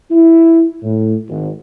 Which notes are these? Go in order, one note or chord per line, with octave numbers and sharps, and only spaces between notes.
E4
A2
G#1